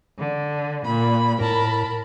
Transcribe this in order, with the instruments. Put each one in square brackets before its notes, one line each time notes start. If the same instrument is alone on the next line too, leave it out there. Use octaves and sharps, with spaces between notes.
[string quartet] D3
A#2 B5
[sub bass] A2 [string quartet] A#4 A5 B5